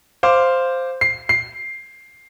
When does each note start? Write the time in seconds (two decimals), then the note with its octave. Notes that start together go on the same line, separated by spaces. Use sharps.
0.23 C5 F5 D6
1.01 C7
1.29 C7